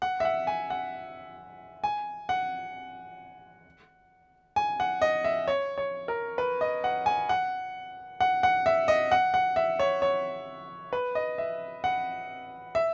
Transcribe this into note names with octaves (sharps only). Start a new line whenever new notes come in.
F#5
E5
F#5
G#5
F#5
G#5
F#5
G#5
F#5
D#5
E5
C#5
C#5
A#4
B4
D#5
F#5
G#5
F#5
F#5
F#5
E5
D#5
F#5
F#5
E5
C#5
C#5
B4
D#5
E5
F#5
E5